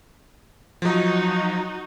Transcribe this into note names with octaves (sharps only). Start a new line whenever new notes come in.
F3 F#3 D#4 F#4